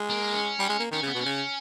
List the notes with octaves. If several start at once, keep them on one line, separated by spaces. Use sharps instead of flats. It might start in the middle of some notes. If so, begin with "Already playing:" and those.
Already playing: G#3
A#3
C#4
G3
G#3
A#3
D#3 C#4
C#3
B3
B2
C#4
C#3